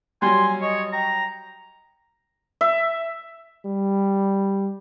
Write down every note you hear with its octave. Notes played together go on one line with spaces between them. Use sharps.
F#3 G3 G#5 C6
C#5 D#5
G5 A#5
E5
G3